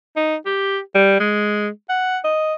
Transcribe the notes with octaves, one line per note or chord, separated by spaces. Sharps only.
D#4
G4
G3
G#3
F#5
D#5